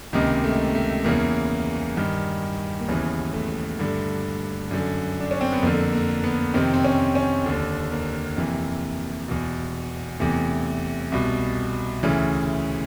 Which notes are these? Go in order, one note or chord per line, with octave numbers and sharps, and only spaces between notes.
C#2 C3 D#3 A#3
A3
A3
E2 C#3 E3 A#3
G2 D#3
A#3
D#2 C#3 E3 B3
A3
G2 D3
F#2 D3
D4
C#4
C4
B3
F2 D3 A#3
A#3
B3
F2 C3 D#3 C4
C4
C#4
C#4
D#2 D3 D4
A#3
F2 C3 E3
E2 B2
E2 C3 E3 A3
C2 B2
D2 C#3 E3